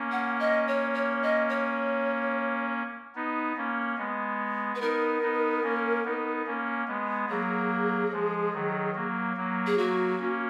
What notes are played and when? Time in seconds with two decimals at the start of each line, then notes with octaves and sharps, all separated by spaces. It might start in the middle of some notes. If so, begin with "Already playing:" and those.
Already playing: A#3 C#4
0.12 F#5
0.40 D#5
0.68 C#5
0.94 C#5
1.23 D#5
1.49 C#5
3.16 B3 D#4
3.57 A#3 C#4
3.98 G#3 B3
4.75 B4
4.81 B3 D#4 A#4
5.23 B3 D#4
5.64 A#3 C#4
6.05 B3 D#4
6.46 A#3 C#4
6.88 G#3 B3
7.29 F#3 A#3 G#4
8.12 F3 G#3
8.54 D#3 F#3
8.95 F#3 A#3
9.36 F#3 A#3
9.67 G#4
9.78 F#3 A#3 F#4
10.19 A#3 C#4